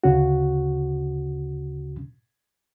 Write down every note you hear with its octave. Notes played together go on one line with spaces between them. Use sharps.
D2 C#3 C#4 F#4